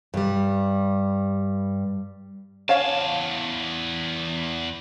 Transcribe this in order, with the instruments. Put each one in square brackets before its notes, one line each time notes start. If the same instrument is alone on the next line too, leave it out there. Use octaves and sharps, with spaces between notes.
[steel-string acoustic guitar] G2 G3
[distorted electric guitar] E2 A5 [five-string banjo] C#5 F5 G#5